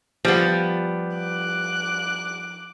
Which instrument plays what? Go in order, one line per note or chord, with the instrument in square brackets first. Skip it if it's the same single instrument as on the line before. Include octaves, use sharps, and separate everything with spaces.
[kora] F3 [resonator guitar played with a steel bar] G3 B3
[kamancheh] D6 F#6